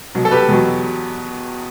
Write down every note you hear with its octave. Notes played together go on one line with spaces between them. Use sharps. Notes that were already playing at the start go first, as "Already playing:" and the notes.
C2 B2 F#3
A4
G4 B4
E2 B2 F#3